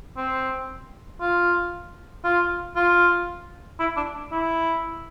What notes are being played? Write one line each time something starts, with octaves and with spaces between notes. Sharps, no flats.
C4
F4
F4
F4
E4
D4
E4